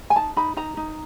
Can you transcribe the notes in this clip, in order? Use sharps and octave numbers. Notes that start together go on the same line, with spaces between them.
G#5
D#4 A5
D#4 B5
D#4 A#5
D#4